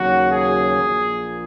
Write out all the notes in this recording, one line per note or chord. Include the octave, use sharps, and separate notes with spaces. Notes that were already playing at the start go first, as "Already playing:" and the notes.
Already playing: D#2 C#3 F#3 F#4
G#4
A#1 A#2 A#3